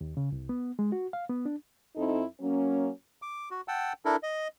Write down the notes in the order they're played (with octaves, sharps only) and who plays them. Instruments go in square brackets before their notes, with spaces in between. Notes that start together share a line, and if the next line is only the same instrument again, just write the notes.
[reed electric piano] D#2
C#3
C2
B3
G#3
F#4
F5
B3
D4
[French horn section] F2 C4 D#4 E4 A4
F#3 A#3 C#4
[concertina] D6
F#4
F#5 G5 A5 E6
D4 E4 A4 A#4
D#5